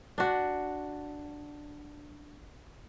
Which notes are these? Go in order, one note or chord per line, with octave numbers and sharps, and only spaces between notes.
D4 F#4